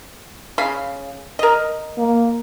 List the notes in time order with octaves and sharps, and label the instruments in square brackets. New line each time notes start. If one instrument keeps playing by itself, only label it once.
[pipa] C#3 F5 B5
A#4 D#5
[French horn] A#3